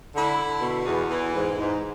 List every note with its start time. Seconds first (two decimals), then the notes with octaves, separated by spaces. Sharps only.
0.14 D3 E4
0.38 D3
0.61 B2
0.86 E2
1.10 E3
1.34 G#2
1.59 G#2